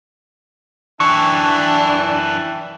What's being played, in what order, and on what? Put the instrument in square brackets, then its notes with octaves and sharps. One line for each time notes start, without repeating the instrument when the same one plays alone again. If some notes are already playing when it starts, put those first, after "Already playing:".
[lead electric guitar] F#2 E3 [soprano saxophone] D4 [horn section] E5 G5 A5 [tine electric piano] C#6